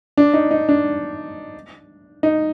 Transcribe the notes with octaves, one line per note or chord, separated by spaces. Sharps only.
D4
D#4
D#4
D4
D#4